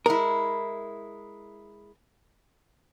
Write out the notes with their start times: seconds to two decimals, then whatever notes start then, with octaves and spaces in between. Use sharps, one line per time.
0.06 G#3 E4 A#4